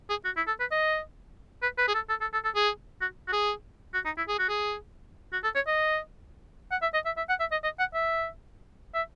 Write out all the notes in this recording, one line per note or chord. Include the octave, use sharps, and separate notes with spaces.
G#4
F#4
E4
A4
B4
D#5
B4
B4
G#4
A4
A4
A4
A4
A4
G#4
F#4
F#4
G#4
F#4
D#4
E4
G#4
F#4
G#4
F#4
A4
C#5
D#5
F#5
E5
D#5
E5
E5
F#5
E5
D#5
D#5
F#5
E5
E5